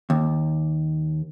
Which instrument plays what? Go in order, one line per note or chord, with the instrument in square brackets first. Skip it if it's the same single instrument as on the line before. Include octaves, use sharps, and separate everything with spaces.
[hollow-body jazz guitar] D#2